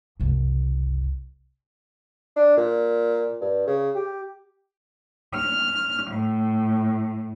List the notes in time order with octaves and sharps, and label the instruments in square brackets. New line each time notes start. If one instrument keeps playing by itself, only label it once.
[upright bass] F#1 C2
[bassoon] D4
A#2
G2
C#3
G4
[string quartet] F6
A2